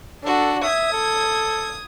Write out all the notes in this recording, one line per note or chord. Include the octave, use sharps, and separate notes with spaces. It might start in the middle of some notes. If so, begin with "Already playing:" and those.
D4 F#4 A4
E5 D#6 G#6
A4